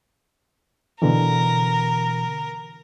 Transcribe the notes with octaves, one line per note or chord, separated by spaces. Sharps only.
B2 D3 E3 A#4